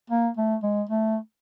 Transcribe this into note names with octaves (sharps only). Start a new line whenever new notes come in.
A#3
A3
G#3
A3